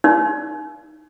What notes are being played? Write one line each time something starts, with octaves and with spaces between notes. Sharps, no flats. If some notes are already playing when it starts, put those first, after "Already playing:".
D#4